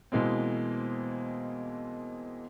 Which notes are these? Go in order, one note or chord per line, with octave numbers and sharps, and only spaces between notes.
B2 E3 G#3 A#3 C4